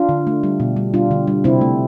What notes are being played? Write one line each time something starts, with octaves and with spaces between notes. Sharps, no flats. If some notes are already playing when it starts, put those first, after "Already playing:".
Already playing: D4 F4
D3
A3
G3
B2
G3
G3 D4 F4
D3
G3
C3 C4 E4
A3